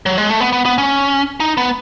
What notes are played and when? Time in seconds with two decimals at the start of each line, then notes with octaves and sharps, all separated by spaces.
0.06 F#3
0.18 G#3
0.29 A3
0.40 B3
0.53 B3
0.65 B3
0.78 C#4
1.40 D#4
1.57 B3